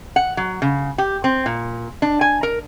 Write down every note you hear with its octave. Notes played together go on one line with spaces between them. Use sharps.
F#5
F#3
C#3
G4
C4
A#2
D4
G#5
A#4